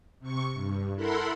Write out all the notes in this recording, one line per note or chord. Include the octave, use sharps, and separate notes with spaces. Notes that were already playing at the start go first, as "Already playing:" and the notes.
C3 C#6
G2
E4 A4 A#4 F#5 B5 C6